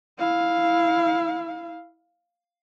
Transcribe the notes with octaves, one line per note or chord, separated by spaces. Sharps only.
E4 F5